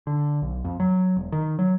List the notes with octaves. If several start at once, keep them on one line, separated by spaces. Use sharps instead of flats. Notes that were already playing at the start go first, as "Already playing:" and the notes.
D3
B1
F2
F#3
E1
D#3
F#3